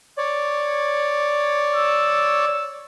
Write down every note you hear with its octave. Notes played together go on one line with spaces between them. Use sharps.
C#5 D5
E6